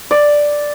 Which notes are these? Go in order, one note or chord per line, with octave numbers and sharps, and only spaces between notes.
D5